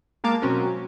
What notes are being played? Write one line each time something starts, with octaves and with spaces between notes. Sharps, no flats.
G#3 A#3 A#4 F5 A5 D6
B2 F#3 C4 C#4 F#4 A#4